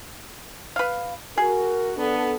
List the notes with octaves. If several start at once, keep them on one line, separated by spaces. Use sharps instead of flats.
B4 F5
F#4 G#4 A#4
B3 D4 A4